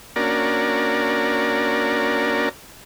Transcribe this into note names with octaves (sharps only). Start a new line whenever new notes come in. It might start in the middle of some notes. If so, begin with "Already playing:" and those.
A#3 C#4 D4 F#4 A#4 D5